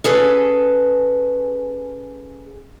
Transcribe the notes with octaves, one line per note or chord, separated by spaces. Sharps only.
C#4 G#4 A4 B4